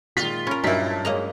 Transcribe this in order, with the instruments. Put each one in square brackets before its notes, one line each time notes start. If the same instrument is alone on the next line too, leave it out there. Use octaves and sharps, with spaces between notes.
[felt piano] A#2 D#3 G#3 [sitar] F4 [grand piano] B6
[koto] C#4 A#4 [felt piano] B5 F6
[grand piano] G2 F#3 B6 [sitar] A#2 [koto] D#4 E4
[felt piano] A5
[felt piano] G#3 C#4 [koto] A#3 D#5 A#5